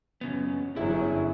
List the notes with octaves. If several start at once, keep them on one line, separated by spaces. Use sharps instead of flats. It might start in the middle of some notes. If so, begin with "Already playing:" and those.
F#2 C#3 B3
G1 F#2 F#3 E4 G#4 E5